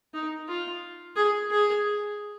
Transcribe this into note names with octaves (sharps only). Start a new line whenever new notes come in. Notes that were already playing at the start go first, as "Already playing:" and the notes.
D#4
F4
G#4
G#4